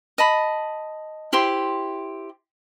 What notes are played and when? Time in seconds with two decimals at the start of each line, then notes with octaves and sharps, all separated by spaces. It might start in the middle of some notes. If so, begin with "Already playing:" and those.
0.18 D#5 A5 B5
1.33 E4 G4 C5 C6